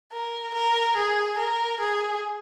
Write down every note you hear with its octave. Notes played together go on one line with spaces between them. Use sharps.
A#4
A#4
G#4
A#4
G#4